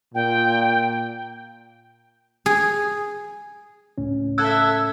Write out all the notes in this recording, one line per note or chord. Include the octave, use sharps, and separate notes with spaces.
A#2 G5
G#4
C#2 A2 C#4
A4 E5 E6 F#6 G#6